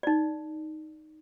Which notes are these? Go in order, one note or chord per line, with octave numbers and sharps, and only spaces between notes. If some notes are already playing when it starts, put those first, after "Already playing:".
D#4 D5